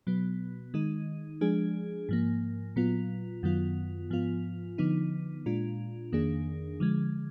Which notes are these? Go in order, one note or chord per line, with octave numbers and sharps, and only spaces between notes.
B2 F#3 B3
D#3 G#3 D#4
F3 G#3 D4 G#4
G#2 F3 A#3
A#2 F#3 B3 F4
F#2 D#3 F#3 B3 F4
G#2 F3 B3 F4
D3 F3 B3 D#4
A#2 G#3 D4 F4
F2 D#3 A#3 D4 G#4
D3 F3 G#3